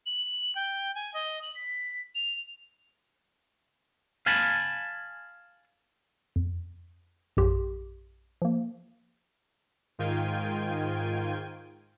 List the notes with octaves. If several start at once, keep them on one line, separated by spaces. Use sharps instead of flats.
F#7
G5
G#5
D#5
F#7
B6
F7
F5 G#5 A5 B5
F2
A#1 F#2 G4 C6
F3 A#3
G#2 D#3 F4 G5 G#6 D#7